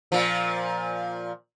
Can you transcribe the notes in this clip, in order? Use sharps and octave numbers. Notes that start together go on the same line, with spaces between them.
A#2 F3